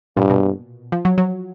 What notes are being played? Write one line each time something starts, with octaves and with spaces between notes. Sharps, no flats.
G2 A#2
B2
F3
F#3
F#3